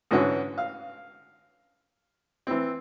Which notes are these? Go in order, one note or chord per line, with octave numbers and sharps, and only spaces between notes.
G#2 D3 E3 C#4 F#4
F5
E3 C4